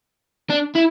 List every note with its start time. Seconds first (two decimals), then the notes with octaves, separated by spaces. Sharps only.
0.50 D4
0.75 E4